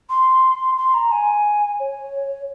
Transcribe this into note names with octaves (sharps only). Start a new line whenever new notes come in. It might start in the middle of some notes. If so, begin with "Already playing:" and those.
C6
C6
A#5
G#5
C#5